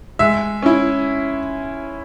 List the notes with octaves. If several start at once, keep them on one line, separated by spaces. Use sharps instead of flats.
G#3 E5
C#4 E4